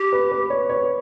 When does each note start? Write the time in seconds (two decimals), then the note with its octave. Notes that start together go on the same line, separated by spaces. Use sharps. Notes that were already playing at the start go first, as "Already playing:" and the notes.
Already playing: G4
0.13 B4
0.32 B4
0.50 C#5
0.69 C#5